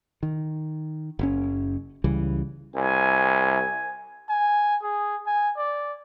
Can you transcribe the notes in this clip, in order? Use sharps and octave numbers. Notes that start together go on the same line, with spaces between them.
D#3
F#1 C#4
C#2 C#3 E3 G3
C2 G#5
G#5
G#4
G#5
D5